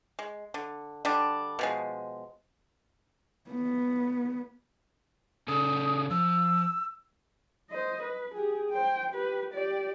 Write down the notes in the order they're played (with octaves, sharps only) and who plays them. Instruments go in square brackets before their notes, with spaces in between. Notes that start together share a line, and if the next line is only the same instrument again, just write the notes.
[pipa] G#3
D3
D3 G3 D4
B2 F3 G#3
[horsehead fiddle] B3
[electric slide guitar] C#3 C#4 A4 [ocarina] D#6
[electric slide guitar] F3 [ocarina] E6
[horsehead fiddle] C5 D#5
B4
G4 G#4
C5 G5
G4 B4
G4 D5